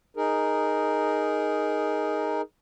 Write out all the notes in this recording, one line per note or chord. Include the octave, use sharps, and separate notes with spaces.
D#4 G#4 A#4